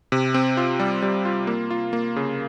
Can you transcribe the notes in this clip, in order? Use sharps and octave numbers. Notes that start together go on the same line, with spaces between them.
C3
C4
F4
G3
G3
F4
A#3
F4
A#3
C#3